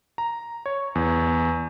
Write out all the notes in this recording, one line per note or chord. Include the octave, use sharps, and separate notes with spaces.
A#5
C#5
E2